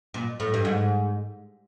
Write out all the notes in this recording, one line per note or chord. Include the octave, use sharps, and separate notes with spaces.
A#2
A2
G2
G#2